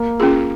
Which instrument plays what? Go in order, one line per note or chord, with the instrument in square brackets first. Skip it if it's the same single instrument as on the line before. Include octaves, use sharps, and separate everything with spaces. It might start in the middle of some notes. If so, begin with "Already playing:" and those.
Already playing: [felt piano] A#3
[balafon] C#4 F4 G#4